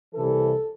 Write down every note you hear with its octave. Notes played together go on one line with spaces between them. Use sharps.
C2 C3 E3 A4